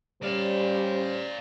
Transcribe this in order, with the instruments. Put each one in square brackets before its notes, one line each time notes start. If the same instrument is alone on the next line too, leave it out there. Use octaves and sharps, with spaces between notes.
[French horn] G3 [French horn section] C#4 C5 [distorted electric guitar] D5 F5